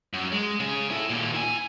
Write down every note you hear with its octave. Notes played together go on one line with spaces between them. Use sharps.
F#2
G#3
C#3 G#4
E4 A4
D#2 A#2
E4 G#5